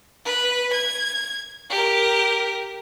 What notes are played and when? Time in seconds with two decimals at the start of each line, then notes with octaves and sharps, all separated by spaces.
0.25 B4
0.73 G#6
1.70 G4 A#4